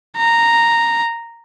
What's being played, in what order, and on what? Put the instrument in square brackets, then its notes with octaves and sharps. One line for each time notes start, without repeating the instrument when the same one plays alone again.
[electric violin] A#5